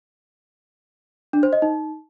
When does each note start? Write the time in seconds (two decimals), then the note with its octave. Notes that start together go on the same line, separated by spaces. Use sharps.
1.33 D4
1.43 C5
1.53 D#5
1.62 D#4